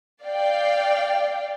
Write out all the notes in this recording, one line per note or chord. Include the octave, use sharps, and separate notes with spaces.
D5 F5 G5